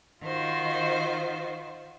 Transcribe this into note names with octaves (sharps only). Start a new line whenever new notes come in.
D#3 F4 F#4 C5